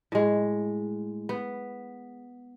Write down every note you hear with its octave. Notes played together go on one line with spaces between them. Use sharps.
A2 G#3
B3